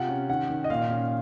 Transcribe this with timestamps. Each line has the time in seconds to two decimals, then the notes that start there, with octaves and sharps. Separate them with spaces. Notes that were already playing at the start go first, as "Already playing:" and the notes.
Already playing: C3 F4 F#5
0.09 C#4
0.29 D#3 F#5
0.50 D#3
0.64 D#5
0.70 A#2 F5
0.90 C#4